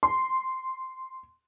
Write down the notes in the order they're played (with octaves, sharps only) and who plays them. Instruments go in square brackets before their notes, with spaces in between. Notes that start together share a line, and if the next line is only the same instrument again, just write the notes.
[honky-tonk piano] C6